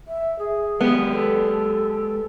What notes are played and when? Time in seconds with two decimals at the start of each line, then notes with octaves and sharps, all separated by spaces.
0.08 E5
0.39 G#4
0.81 G#3 B3 G4
1.12 A4